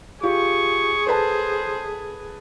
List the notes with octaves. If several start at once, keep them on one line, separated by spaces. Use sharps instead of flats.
F4 G4 G#4 C#6
A4 B4 C5 A5